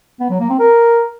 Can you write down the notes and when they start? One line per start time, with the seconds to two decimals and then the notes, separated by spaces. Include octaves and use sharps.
0.20 B3
0.30 F#3
0.40 A#3
0.50 C4
0.60 A#4